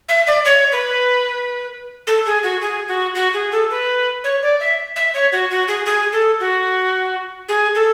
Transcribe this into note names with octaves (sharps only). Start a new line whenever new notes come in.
E5
D5
C#5
B4
A4
G#4
F#4
G#4
F#4
F#4
G#4
A4
B4
C#5
D5
E5
E5
C#5
F#4
F#4
G#4
G#4
A4
F#4
G#4
A4